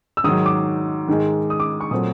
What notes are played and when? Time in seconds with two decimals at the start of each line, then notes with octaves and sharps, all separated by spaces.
0.17 E6
0.24 G#2 D#3 F#3 D#6
0.46 D6
1.08 G#2 D#3 G#3
1.50 D#6
1.60 D6
1.81 C#6
1.91 A#2 F#3 A3 C4 D#6